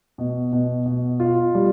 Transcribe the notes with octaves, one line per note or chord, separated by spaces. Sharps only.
B2
B2
B2
F4
G3